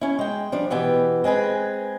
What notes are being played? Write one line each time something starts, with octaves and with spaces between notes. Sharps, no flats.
C#4 E4
G#3 G5
F3 G3 D4
B2 E3 B3 G4
G#3 C4 G#4 B4